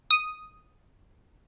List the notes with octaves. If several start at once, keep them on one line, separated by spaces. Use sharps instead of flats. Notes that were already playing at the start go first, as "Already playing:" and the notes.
D#6